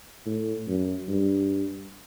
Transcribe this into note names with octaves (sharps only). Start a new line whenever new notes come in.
A2
F#2
G2